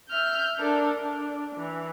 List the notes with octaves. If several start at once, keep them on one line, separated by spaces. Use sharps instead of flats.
E5 F6 G6
D4 A4 A#4
D4
E3